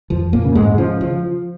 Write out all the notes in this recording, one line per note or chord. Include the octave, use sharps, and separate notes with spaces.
F2 F3
A#2 A#3
C#3
G#2 G#3
C#3 F3
F3